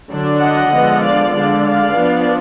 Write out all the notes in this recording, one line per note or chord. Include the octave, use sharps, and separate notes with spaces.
D3 F#3 D4
D#5 F#5
D3 F3 G#3 B3 D4
D5 F5
D3 G#3 D4 D5 F5
D5 F5
F3 B3 D4